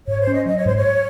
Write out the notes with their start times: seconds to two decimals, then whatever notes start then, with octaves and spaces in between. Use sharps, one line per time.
0.07 G#2 C#5
0.20 C5
0.27 C#4
0.33 D#5
0.46 F#3 D#5
0.57 C#5
0.65 G#2 C5
0.76 C#5